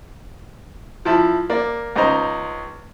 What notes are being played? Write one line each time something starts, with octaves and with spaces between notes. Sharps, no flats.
F3 E4 A5
A#3 D5
C#2 D#4 C5 A#5